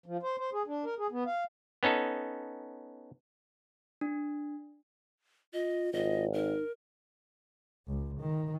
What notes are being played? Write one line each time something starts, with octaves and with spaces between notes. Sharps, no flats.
F3
C5
C5
G#4
D4
A#4
G#4
B3
F5
B3 C#4 D#4 A4
D4
F4 D#5
G#1 F4 D#5
D#4 A#4
C#2
D#3